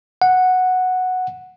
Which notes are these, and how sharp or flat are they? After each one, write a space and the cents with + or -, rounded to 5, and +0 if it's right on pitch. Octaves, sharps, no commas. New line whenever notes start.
F#5 -5